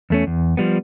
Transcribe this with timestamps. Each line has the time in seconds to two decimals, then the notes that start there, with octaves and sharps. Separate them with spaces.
0.10 E2 A3 C#4
0.27 E2
0.57 F3 G3 B3